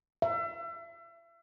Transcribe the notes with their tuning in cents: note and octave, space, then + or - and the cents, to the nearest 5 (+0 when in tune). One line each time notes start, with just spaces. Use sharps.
E5 +35